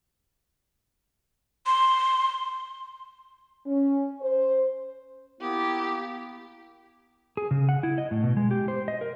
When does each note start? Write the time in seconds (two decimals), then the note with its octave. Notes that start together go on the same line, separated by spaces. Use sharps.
1.66 C6
3.65 C#4
4.20 C5
5.41 A#3 B3 E4 G4
7.37 G#4
7.51 C#3
7.69 F#5
7.83 E4
7.98 D#5
8.11 A2
8.24 B2
8.37 G#3
8.51 G4
8.68 C5
8.88 D#5
9.01 A#4